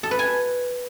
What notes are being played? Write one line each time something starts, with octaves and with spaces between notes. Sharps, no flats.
A4
B4
G#5